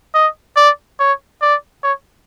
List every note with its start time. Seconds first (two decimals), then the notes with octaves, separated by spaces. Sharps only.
0.14 D#5
0.56 D5
0.99 C#5
1.42 D5
1.83 C#5